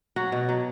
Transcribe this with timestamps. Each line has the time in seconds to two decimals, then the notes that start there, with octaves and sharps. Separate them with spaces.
0.16 F#3 F#4
0.32 B2
0.49 F#3